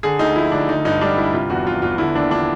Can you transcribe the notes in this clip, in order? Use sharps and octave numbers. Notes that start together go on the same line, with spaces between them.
D3 G#4
D2 D#4
F3 E4
D2 D4
D3 D#4
G2 D#4
G3 D4
G2 E4
C3 F4
E2 F#4
F3 F4
E2 F4
D3 E4
D#2 D4
F3 D4